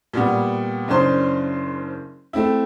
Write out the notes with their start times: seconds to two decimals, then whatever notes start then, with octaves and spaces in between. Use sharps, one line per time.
0.13 A#2 G3 B3
0.88 F#1 C#3 C#4 D4 C5 C6
2.33 A3 C4 E4